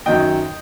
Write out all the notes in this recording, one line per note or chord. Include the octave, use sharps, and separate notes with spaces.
F#2 D#3 F#3 D#5 G5